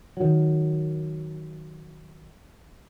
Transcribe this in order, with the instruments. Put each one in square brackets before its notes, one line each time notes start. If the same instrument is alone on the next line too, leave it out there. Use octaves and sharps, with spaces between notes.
[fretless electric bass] D#3 F#3